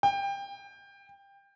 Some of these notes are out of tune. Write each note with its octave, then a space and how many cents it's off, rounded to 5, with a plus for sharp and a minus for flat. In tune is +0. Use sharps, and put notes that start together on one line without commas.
G5 +20